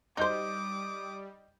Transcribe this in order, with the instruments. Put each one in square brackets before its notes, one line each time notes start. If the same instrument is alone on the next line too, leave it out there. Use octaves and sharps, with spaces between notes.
[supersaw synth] G3 [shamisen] D#4 C5 [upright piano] D#5 G6 [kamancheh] D6 D#6